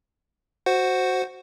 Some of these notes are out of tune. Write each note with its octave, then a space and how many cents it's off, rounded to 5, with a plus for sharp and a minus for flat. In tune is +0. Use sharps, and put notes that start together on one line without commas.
F#4 +0 C5 +0 F#5 +0